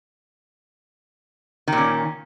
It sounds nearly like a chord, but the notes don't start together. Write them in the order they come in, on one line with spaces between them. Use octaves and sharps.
D#3 A#2 C#4